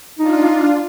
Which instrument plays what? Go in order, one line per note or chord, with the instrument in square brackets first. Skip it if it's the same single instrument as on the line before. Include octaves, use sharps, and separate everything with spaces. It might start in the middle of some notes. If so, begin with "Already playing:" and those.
[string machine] D4 F4 [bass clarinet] D#4